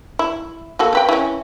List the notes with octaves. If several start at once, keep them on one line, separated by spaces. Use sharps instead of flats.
E4
A#3 F#4 A4
C4 B4 G5
E3 C#4